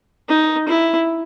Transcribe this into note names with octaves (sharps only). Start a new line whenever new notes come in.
D#4
E4